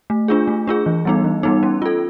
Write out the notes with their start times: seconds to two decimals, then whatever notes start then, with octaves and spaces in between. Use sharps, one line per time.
0.10 A3
0.28 D4 F4 G#4
0.48 A3
0.67 D4 F4 G#4
0.86 E3
1.05 G3 B3 D#4
1.25 E3
1.43 G3 B3 D#4
1.63 C#4
1.82 F4 A4